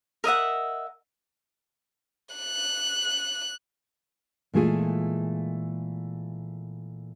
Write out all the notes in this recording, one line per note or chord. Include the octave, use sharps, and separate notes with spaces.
A#4 D#5 E5 F#5
F#6
A#2 E3 G#3 A3 F4 G#4